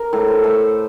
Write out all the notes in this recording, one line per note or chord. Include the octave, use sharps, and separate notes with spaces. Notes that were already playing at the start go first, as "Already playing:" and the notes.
Already playing: A#4
A2
C5
A3